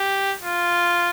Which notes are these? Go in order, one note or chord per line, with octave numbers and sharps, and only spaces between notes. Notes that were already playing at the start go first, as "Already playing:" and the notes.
Already playing: G4
F4